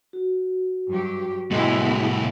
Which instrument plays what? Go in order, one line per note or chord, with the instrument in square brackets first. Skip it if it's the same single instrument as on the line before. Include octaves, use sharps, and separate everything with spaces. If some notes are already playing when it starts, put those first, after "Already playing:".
[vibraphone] F#4
[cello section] G2 F#3 G4
[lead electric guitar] C2 A2 [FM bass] G#3 [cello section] B3 E4